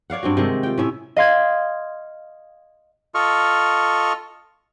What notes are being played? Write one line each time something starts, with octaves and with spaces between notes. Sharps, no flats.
C#5 D5 F5 F#5
G2 C4 F#4
C3 D#3 G#3
F4 G5
A2 C#4 E5
D#5 F5 C6 G#6
F4 A4 D#5 C#6 F6